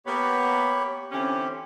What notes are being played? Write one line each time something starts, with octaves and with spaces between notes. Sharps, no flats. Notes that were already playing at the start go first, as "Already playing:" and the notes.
A#3 B3 G4 C#5 B5
D3 E3 C4 C#4 G4